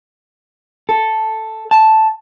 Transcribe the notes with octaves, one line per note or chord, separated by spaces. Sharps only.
A4
A5